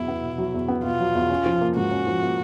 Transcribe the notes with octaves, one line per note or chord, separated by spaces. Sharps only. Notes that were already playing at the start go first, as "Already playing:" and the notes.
Already playing: E2 B2 F#3 E4
B3
B2
F#3
E2
B3
B2 F4
F#3
E2
C#4
F3
A#3
G#2 F#4
C#4
F3
A#3